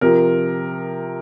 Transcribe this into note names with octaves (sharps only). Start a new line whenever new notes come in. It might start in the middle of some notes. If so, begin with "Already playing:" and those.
C3 F3 A#4